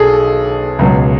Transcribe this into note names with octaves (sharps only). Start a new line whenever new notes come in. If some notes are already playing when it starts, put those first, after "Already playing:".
Already playing: B1 B2 G#4 A4
C#2 B2 F#3